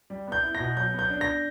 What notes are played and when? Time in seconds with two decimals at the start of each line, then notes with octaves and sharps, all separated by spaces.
0.10 G3
0.27 B3 G6
0.43 E4
0.55 A#6
0.60 B2
0.77 F#3 G6
0.94 B3
0.99 G6
1.10 D4
1.21 A#6